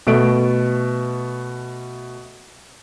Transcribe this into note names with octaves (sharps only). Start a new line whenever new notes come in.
B2 A3 D7